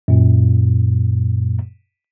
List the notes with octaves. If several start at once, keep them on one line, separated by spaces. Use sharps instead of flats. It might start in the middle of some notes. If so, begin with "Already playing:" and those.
F#2 A#2